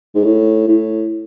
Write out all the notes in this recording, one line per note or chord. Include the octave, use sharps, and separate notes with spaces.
G#2
A2
A2